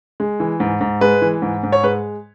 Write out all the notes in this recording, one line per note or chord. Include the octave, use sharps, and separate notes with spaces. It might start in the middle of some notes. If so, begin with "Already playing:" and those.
G#3
E3
G#2
G#2
G#3 B4
E3
G#2
G#2
C#5
G#3 B4